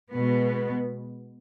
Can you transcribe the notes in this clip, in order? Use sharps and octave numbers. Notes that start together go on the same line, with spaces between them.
B2 G#3 B3